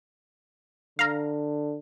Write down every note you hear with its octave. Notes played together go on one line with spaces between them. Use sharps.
D3 F5 A#5